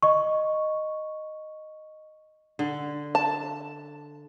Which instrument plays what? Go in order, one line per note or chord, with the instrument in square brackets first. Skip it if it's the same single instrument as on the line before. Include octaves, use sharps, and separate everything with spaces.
[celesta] D#5 C#6
[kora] D3
[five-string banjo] A5